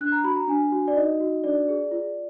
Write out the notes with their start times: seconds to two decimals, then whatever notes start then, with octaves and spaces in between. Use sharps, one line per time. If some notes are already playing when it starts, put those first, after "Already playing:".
0.01 D4 F#6
0.12 A#5
0.24 F#4 B5
0.36 A#5
0.48 D4 G#5
0.72 F#4
0.88 D5
0.96 D#4 D#5
1.20 F#4
1.44 D4 D5
1.69 G#4
1.91 F4